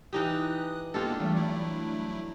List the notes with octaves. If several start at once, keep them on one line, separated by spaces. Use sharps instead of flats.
E3 D#4 G4 D#6 F#6
G#3 A#3 B3 D4 F4 G4 A4
E3 G3 A3
F#3 A3 E4